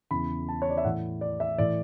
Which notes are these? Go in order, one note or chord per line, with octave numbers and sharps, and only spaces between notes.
E2 C#3 E3 B5
A5
C#5
D5
E5
A2 E3 F#5
D5
E5
A2 E3 D5